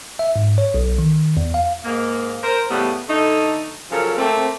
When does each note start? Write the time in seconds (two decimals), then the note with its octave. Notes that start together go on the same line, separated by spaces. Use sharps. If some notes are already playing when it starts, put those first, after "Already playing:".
0.19 E5
0.36 G#2
0.58 C#5
0.74 B1
0.99 D#3
1.37 E2
1.54 F5
1.85 G#2 A#3
2.43 A#4 C5
2.70 A2 C#3 G3 B3
3.09 D3 A3 D#4
3.92 C#3 F3 F#3 A4 A#4
4.18 A3 A#3 C4